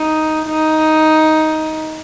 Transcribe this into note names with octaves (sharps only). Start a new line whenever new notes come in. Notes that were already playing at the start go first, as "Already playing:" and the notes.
Already playing: D#4
D#4